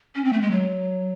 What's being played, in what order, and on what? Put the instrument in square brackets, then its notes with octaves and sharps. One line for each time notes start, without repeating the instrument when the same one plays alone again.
[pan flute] C#4
C4
A3
G#3
F#3